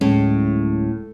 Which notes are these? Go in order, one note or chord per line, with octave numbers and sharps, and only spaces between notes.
D1 A2 G#3 C#4